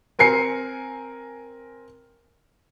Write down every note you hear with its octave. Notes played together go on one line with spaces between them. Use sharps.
C4 A#4 G#5 C7 C#7